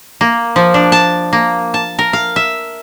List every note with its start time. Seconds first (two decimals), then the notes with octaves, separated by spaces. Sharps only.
0.21 A#3
0.56 F3
0.74 D4
0.92 A5
1.33 A#3
1.74 A5
1.99 A#4
2.13 F5
2.36 E5